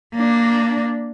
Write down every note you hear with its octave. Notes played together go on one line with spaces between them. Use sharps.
A#3 D4